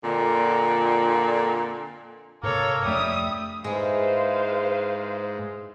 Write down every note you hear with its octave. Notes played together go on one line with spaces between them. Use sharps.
F2 A#2 D3
G#2 C3 A#3 A4 C#5
F2 G3 A3 D4 E5 D#6
G#2 G#3 E4 B4 C5 F5